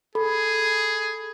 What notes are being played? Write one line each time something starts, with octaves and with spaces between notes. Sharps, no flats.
G#4 A4 B5